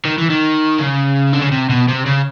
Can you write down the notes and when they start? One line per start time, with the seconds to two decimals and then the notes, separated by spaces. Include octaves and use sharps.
0.05 D#3
0.18 E3
0.30 D#3
0.79 C#3
1.33 D3
1.42 C#3
1.51 C3
1.69 B2
1.88 C3
2.06 C#3